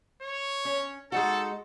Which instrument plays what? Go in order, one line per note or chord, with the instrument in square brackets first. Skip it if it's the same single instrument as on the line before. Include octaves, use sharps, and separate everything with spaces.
[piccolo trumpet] C#5
[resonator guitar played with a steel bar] C#4
[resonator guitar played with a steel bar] G#3 D#4 F#4 [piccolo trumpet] A4